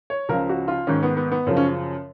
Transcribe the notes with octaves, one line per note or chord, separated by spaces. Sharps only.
C#5
C#2 C#3 F3 A#4
F#4
F4
G#2 D#3 C#4
B3
B3
B3
F#2 C#3 F3
C#4